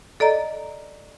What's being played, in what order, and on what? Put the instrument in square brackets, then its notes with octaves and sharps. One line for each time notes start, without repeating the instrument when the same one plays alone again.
[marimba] A4 D5 D#5 A#5